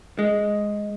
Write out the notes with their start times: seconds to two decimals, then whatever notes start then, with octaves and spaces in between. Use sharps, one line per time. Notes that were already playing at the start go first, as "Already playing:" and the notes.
0.19 G#3